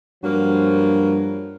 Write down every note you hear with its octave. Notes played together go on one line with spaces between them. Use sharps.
G2 F3 F#3 A#3